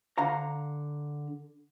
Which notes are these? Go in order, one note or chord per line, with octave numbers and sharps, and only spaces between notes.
D3 F5 A#5